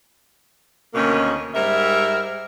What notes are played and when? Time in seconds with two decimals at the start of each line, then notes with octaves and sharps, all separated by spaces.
0.94 D2 B2 D#3 A#3 C#4
1.54 G#2 G3 A#4 E5